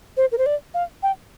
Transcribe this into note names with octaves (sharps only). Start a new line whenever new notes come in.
C5
A#4
C5
D5
F5
G5